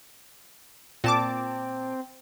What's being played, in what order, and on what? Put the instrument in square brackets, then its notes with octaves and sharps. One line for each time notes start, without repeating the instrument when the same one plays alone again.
[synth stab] A#2 A5 D6 [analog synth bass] C4